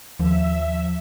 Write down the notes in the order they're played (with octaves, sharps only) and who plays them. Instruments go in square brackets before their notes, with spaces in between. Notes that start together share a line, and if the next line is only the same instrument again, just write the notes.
[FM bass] D#2 [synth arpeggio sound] F3 [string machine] E5